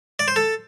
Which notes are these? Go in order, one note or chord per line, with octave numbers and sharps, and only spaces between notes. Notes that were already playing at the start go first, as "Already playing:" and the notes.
D5
C5
A4